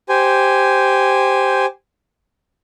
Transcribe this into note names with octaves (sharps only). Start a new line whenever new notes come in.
G4 C5 G#5